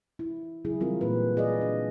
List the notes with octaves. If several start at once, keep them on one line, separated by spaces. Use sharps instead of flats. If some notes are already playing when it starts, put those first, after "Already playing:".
E4
C#3 F#3 E4 G#4
E3 G3 C4 F4 A#4
A#2 A#3 F#4 B4
D#4 G#4 D5 D#5
D4